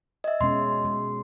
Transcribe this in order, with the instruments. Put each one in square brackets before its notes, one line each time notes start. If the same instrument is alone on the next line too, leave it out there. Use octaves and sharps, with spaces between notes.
[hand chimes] D#5 E5
[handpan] B2 G#3 C#4 [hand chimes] C6
[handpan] G#3